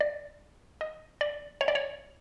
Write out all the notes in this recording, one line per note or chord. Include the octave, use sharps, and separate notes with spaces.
D5
D#5
D5
C#5
D5
C#5